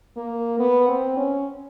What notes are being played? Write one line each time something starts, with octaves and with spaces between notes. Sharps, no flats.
A#3
B3
C4
C#4